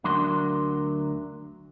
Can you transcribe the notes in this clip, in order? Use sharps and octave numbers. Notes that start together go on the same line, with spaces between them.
D2 F#3 D4 A#4 C6